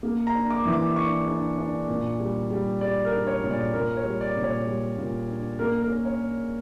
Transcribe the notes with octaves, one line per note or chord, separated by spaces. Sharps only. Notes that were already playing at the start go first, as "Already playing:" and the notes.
A#3
A#5
D4
D6
E3
D6
D4 C#6
D4
D4
A#2
G3
G3
G3 D5
A#4
D4
C#5
A#2
D5
A#2 A#4
C#5
G3
D5
A#2
C#5
G3
A#2
D4
A#3 A#4
A#4
C#4
C#5